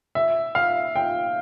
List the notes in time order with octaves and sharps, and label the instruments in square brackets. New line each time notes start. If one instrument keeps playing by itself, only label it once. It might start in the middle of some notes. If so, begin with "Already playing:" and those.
[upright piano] E5
F5
G5